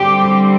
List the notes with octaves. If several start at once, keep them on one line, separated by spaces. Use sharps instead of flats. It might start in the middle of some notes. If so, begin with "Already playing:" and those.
Already playing: D3 G3 C4 G4